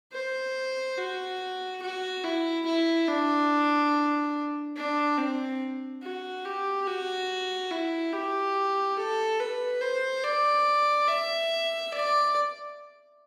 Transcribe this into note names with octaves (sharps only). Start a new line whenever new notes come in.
C5
F#4
F#4
E4
E4
D4
D4
C4
F#4
G4
F#4
E4
G4
A4
B4
C5
D5
E5
D5